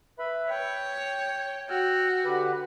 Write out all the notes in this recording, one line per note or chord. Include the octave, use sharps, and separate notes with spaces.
B4 E5 B5
C#5 G5
F#4 G5 E6 F6
D3 G4 B4